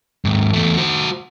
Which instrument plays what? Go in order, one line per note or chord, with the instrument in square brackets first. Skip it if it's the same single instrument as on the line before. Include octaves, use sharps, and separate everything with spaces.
[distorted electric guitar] D#2 G#2
E2 A3
F#4 C5